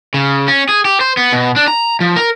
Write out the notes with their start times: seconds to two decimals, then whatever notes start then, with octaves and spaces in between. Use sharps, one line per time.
0.14 C#3
0.48 C#4
0.69 G#4
0.85 G4
1.01 C5
1.17 B3
1.33 B2
1.56 D4
1.68 A#5
2.00 F3
2.16 A#4